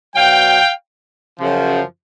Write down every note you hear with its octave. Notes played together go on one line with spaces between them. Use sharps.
B2 F#3 F5 G5
F#2 C#3 F3